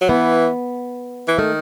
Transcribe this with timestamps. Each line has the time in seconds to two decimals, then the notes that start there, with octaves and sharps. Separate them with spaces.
0.01 F#3
0.09 E3 B3
1.28 E3
1.38 D#3 A3